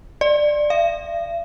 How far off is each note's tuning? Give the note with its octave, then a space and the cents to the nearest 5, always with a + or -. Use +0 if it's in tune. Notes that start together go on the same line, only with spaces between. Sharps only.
D5 +15
F5 -45